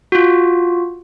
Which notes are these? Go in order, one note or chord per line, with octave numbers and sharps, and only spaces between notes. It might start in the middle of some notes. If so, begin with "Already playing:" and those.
F4 F#4